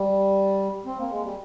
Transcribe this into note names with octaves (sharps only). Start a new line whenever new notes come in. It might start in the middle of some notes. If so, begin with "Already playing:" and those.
Already playing: G3
C4
A#3
G#3
G3